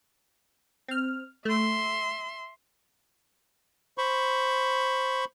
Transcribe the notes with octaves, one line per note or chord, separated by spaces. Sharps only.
C4 F6
A3 E5 C6
C5 B5 C#6